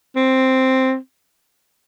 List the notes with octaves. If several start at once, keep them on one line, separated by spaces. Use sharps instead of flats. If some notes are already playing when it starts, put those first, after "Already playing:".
C4